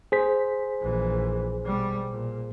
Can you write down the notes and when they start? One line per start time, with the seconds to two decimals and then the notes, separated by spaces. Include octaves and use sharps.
0.12 G#4 C5 B6
0.82 A#1 E3
1.65 B2 G3
2.11 A#2